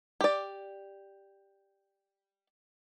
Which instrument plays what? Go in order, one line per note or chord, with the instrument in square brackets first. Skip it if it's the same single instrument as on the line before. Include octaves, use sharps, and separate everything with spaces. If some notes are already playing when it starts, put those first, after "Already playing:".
[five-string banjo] G4 D5